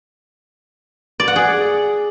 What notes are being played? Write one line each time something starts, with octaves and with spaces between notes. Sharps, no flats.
D5
F#5
G#4